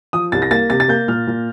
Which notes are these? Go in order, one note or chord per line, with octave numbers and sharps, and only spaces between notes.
F3 D#6
C2 A6
A#6
A#3 A6
C3 A6
A6
A#3 G6
A#2 F6
A#2